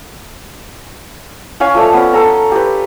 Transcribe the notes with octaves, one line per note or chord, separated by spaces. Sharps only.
C#4 C#5 F5 G#5
F3 A3 D5
B3 C#4
A4 G#5 A#5
G4 B4